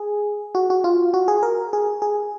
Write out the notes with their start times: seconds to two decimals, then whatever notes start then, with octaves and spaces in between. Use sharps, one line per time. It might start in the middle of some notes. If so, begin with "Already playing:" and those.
Already playing: G#4
0.55 F#4
0.70 F#4
0.84 F4
1.14 F#4
1.28 G#4
1.43 A#4
1.73 G#4
2.02 G#4